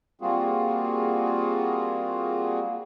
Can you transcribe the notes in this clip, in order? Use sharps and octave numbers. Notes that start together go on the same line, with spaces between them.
G3 A#3 C4 F4 F#4 G#4